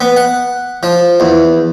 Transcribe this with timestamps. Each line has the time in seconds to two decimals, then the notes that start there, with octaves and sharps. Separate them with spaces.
0.01 B3
0.16 F#5
0.83 F3
1.20 E2